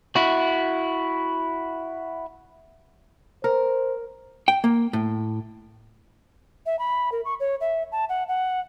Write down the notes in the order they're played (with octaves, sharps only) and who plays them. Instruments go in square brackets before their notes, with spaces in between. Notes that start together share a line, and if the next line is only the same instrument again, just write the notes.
[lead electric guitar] E4 F#4
[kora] A#4 [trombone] C5
[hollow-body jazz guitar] G5
A#3
A2
[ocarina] E5
B5
A#4
C#6
C#5
E5
A5
F#5
F#5